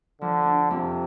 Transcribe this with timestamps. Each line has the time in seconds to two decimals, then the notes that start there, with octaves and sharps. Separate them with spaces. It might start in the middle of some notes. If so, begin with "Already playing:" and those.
0.21 D3 F3
0.46 D4
0.70 F2 C3